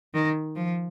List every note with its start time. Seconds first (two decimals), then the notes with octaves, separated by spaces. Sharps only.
0.14 D#3
0.56 F3